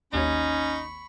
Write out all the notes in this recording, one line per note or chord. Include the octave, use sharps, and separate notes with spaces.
G#1 D#2 C#4 D#4 C#5 B5 C#6